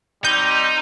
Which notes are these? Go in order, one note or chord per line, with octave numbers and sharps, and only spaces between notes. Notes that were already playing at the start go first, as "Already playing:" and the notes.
G3 C4 D#4 G6